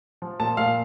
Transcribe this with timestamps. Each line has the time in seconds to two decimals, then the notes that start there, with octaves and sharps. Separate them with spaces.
0.22 F3
0.40 A#2 A5
0.57 A#2 F5